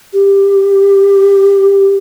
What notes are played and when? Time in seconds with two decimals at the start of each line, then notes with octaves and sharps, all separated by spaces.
0.13 G4